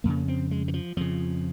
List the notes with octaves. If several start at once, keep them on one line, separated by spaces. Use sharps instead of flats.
F2 C#3 A#3
C4
G#3
D#3
F3
F2 C#3 F3